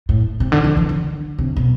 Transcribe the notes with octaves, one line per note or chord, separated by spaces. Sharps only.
A2
C3
D3
F3
E3
D3
C3
B2